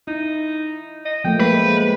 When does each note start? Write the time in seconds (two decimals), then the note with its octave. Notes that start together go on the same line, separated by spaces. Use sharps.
0.07 D#4 E4
1.05 D#5
1.24 F3 A3 A#3 G5
1.40 G#3 B4